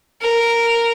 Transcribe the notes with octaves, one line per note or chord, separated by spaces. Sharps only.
A#4